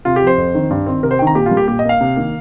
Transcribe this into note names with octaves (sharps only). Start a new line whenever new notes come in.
C3 F4
G4
F3 C4 C5
F2
D#3 C4
G2
D#3 C4
C3 A#4
C5
D#3 C4 G5
A#5
A#2 G4
F4
G3 A#3
G4
A#2 G4
D#5
A#3 F5
C3
D#3 A#3